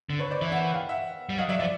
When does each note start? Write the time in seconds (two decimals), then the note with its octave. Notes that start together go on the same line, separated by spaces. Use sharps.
0.10 D3
0.19 B4 C#5
0.30 C5 D5
0.42 E3 D5 E5
0.52 E5 F#5
0.74 F5 G5
0.89 E5 F#5
1.29 G3
1.38 F#3 D#5 F5
1.49 F#3 D5 E5
1.59 F3 D5 E5